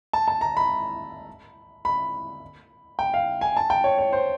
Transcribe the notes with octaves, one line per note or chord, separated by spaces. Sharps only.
A5
A5
A#5
B5
B5
G5
F5
G#5
A5
G5
C#5
C#5
C5